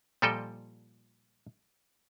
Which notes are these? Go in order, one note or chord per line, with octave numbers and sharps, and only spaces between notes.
A#2 F3 G3 A4 D#5 G5